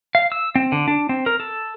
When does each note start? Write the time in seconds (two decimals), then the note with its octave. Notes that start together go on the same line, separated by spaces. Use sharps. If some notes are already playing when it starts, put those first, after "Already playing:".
0.15 F5
0.32 E6
0.56 C4
0.72 D3
0.88 D4
1.09 C4
1.26 A#4
1.40 A4